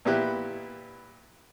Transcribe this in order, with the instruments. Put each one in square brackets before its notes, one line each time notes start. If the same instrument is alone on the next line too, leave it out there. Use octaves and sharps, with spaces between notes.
[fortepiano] A#2 B3 E4 G4 F#6